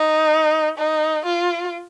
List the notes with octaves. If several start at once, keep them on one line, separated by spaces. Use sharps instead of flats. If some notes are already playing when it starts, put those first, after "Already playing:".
Already playing: D#4
D#4
F4